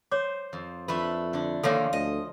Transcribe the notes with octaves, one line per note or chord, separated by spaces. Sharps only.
C5 C#5 D6
F2
F2 A3 D4 E4 B4
D3 D4
D3 D#3 F3 A#3 A4 C#5 G#5
D2 D#5